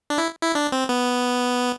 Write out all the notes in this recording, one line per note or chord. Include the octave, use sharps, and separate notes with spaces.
D4
E4
E4
D4
C4
B3